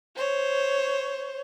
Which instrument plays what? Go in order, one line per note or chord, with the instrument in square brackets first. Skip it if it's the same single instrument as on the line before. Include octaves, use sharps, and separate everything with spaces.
[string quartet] C5 C#5